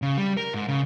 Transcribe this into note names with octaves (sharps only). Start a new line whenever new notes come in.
C#3
G3
A#4
G#2
C#3